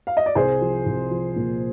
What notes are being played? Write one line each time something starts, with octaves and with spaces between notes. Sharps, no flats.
F5
D#5
D5
C2 G#4 C5
F3
C2
F3
A#2